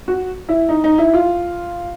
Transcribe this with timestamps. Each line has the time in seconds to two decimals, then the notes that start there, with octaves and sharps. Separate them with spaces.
0.08 F#4
0.49 E4
0.69 D#4
0.84 D#4
0.98 E4
1.14 F4